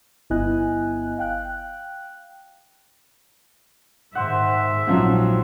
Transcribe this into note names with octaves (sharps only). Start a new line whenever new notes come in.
G1 B3 E4 D#5 G#5 F#6
F5 G5 F#6
G#2 D#3 C5 E5 F#5
A#1 G#2 F3 F#3 C4